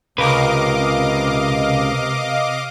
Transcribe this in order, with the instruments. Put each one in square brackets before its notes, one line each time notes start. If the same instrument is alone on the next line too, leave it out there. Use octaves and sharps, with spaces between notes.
[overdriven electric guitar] C#2 [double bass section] C3 [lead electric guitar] A#4 B4 [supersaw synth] D#5 F5 D6